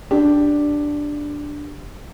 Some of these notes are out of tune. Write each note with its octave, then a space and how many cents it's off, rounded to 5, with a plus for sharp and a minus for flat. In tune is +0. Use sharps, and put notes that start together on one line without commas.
D4 +0 G4 +0